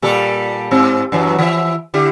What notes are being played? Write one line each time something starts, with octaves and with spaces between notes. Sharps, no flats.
A#2 G3 A4
G#2 C4
F#2 E3 F#3
E3 G#4 E5
D3 E4 G4